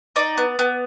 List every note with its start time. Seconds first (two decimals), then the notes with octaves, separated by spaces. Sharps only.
0.16 D#4 D5
0.38 B3
0.59 B3